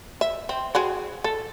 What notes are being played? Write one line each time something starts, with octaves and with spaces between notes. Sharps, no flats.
E5
C4
C4 F#4 G#4
A4